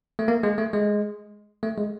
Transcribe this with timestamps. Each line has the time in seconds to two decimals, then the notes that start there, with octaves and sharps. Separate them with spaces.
0.19 A3
0.28 A#3
0.43 G#3
0.58 A3
0.73 G#3
1.63 A3
1.78 G#3